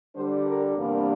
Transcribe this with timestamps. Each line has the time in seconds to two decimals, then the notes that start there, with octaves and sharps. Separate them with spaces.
0.15 D3 G3 D4 C5
0.46 A#4
0.76 E2 C3 G3 A#3 D4